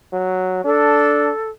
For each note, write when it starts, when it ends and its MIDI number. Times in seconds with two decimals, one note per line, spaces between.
0.13 0.61 54
0.64 1.30 62
0.64 1.49 69